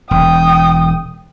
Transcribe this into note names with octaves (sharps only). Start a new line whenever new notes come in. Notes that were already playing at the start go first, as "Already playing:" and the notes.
E1 G5 D#6